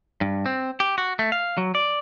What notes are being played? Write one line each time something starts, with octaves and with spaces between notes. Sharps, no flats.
G2
C4
G4
F#4
A3
F5
F#3
D5